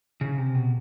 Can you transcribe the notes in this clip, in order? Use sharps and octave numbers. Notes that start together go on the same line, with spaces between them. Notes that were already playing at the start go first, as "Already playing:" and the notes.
C#3
C3
B2